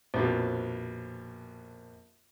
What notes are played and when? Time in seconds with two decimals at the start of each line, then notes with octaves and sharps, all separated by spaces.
0.14 A#1 F2 B2